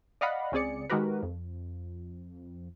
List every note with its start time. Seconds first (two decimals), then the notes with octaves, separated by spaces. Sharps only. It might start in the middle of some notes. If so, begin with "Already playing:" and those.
0.21 D5 D#5 F5 F#5 B5
0.52 C#2 C#3 C4 G#4 D5 C#7
0.90 D#3 G#3 F#4 G4 A#4 B4
1.23 F2